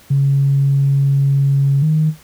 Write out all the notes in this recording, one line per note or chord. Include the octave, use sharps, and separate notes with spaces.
C#3
D#3